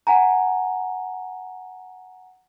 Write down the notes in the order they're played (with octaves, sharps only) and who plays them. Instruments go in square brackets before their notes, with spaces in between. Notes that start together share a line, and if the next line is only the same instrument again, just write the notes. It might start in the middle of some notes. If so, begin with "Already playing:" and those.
[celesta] F#5 G#5 A#5